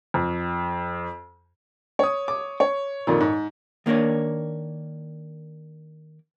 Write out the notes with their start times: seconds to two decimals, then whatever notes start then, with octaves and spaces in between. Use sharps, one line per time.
0.14 F2
1.99 C#5 D#6
2.28 D6
2.60 C#5
3.07 F2 A#2 D#3
3.20 G#2
3.86 D#3 A#3 D4 A#4 C#5